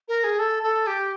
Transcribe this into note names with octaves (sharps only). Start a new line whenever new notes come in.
A#4
G#4
A4
A4
G4